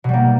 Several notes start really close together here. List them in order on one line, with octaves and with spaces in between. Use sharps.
B2 G3 A#3